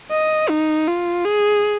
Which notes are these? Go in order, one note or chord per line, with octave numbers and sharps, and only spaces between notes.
D#5
D#4
F4
G#4